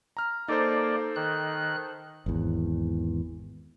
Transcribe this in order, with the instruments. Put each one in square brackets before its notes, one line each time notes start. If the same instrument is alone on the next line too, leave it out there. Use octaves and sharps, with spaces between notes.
[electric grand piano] A#5 F6
[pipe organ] A#3 D5 [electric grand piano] D#4 A4 C5
[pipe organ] D#3 F#6
[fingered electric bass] G#1 E2